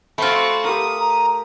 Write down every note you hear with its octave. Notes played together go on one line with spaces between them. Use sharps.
A3 C4 F4 F#4 B5
G4 A#4 D#6
A#5